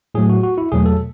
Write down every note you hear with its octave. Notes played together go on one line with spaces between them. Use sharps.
A2 F#3 A3 G#4
F#4
F#4
E4
E2 B2 F#3 A3 G#4
A4